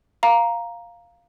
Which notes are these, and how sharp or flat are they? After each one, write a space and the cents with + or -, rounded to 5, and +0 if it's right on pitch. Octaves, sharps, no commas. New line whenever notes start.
F5 +0 A#5 +5